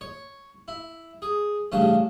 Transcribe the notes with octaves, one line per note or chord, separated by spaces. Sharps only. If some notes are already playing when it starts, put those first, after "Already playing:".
C#5
E4
G#4
A1 G2 C#3 A5